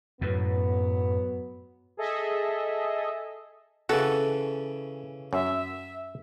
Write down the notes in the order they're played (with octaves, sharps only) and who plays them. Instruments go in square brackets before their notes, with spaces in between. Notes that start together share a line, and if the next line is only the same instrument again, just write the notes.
[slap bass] F#2 A2 [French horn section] F#3 B3
[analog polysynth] G#4 A4 D#5 E5
[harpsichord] C#3 E3 C#4 [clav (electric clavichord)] F#4 [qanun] A4
[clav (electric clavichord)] F#2 [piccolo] E5